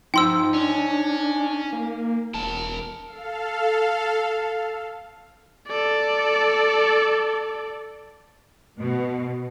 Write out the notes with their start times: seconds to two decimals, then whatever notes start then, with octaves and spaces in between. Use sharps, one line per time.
0.14 F3 D#4 C5 G5 C6 E6
0.54 C#4 D4
1.72 A#3
2.34 E1 A#4 A5
3.05 A4 F5
5.68 A4 D5
8.79 B2